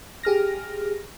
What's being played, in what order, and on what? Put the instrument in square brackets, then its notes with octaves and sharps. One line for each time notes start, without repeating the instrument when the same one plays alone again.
[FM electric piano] G4 G#4 F6 A#6